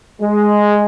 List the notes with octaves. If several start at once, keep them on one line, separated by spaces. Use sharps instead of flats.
G#3